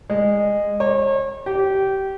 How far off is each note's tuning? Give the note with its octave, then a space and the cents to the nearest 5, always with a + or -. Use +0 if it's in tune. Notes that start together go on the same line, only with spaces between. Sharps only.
G#3 -20
C#5 -40
G4 -20